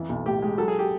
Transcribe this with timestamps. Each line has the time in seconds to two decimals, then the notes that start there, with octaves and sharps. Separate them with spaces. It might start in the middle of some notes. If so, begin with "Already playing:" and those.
Already playing: F2 E3
0.09 B1
0.26 A2 G4
0.42 G#3
0.58 F#3 A4
0.68 G#4
0.79 G4